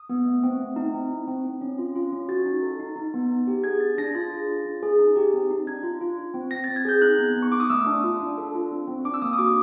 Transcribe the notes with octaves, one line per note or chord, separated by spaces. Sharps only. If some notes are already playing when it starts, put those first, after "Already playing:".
Already playing: D#6
B3
A3
C4
A3
D#4
C4
E4
C4
C4
C#4
F4
F4
C#4
F#4 A6
D#4
A4
D#4
D#4
B3
D#4
G4
G#4 G#6
D4 A6
D4 A#6
F4 A6
G#4
F4
C#4
G#4
D#4
G4
C4
D#4
D4 G#6
F4
F4
F4
C4
C4 A#6
C4 A6
G#6
G#4 G6
D#4 F#6
B3
B3
C#6
D#4 D6
D#6
A3 E6
D4
F4
D4
A4
F4
C4
C4
D4 D6
E6
A#3 D#6
D#6
F#4 D6